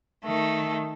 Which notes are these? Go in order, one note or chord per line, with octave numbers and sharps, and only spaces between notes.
D#3 A3